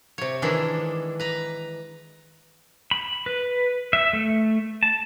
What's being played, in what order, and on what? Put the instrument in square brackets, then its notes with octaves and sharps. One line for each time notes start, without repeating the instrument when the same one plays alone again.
[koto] C3 C#5
D#3 E3 G#3 D4 E4
B4 A#5
[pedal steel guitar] B5
B4
E5
A3
A5